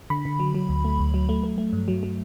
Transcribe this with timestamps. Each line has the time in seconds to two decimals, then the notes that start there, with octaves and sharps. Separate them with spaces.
0.10 D3 B5
0.25 D3
0.39 F#3
0.54 F#3
0.69 D2
0.85 A3
0.99 D2
1.14 F#3
1.29 A3
1.44 A3
1.58 A3
1.73 G2
1.88 F#3
2.03 F#3